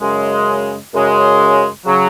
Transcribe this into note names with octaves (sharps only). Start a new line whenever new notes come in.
F#2 C#3 G#3
F#2 C#3 G#3
C#3 F#3